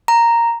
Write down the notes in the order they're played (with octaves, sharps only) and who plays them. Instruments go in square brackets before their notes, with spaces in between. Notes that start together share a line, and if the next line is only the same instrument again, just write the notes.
[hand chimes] A#5